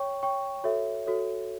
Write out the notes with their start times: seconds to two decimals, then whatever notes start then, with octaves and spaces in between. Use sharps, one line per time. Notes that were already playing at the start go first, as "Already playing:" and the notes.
Already playing: C#5 G5 C#6
0.23 C#5 G5 C#6
0.64 F#4 A4 C#5 E5
1.05 F#4 A4 C#5 E5